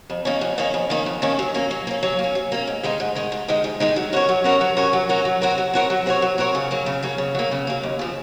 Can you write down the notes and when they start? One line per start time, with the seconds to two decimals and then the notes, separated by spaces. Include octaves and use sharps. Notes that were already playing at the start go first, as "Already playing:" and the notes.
0.10 F2
0.25 D#3 A#3 C#4
0.41 F2
0.58 D#3 A#3 C#4
0.74 F2
0.90 D#3 A#3 C#4
1.06 F2
1.22 D#3 A#3 C#4
1.39 F#3
1.54 A#3 C#4
1.71 F#3
1.87 A#3 C#4
2.03 F#3
2.19 A#3
2.24 C#4
2.35 F#3
2.52 A#3 C#4
2.67 G#2
2.83 D#3 G#3 D#4
3.00 G#2
3.15 D#3 G#3 D#4
3.32 G#2
3.48 D#3 G#3 D#4
3.64 G#2
3.80 D#3 G#3 D#4
3.96 F#3
4.13 C#4 F#4 A#4 C#5
4.29 F#3
4.44 C#4 F#4 A#4 C#5
4.61 F#3
4.77 C#4 F#4 A#4 C#5
4.93 F#3
5.09 C#4 F#4 A#4 C#5
5.25 F#3
5.42 C4 F#4 A#4 C#5
5.58 F#3
5.73 C4 F#4 A#4 C#5
5.90 F#3
6.06 C4 F#4 A#4 C#5
6.22 F#3
6.38 C4 F#4 A#4 C#5
6.55 C#3
6.71 F#3 A#3
6.86 C#3
7.03 F#3 A#3
7.18 C#3
7.35 F#3 A#3
7.51 C#3
7.67 F#3 A#3
7.83 D#2
7.99 C#3 F3